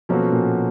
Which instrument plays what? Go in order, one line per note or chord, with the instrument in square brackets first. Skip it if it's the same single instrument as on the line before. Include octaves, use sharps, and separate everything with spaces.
[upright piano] B2 [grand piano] F3 A#3 C#4 F#4 A4
[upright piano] A#2